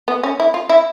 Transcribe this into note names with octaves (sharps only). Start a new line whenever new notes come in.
B3
C#4
E4
F4
E4